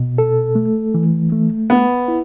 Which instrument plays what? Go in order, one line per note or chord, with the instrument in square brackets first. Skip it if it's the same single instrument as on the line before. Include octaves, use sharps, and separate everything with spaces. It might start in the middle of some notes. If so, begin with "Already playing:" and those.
Already playing: [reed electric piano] B2
A4
A3
E3
A3
[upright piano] B3 [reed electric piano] B4
[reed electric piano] E4